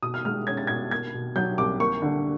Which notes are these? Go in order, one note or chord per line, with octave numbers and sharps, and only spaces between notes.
B2 D#6
F6
G#3 F6
C#4 G#6
A6
B2 G#6
A#3 G#6
B2
F#3 G6
C2 D6
A#3 C#6
D3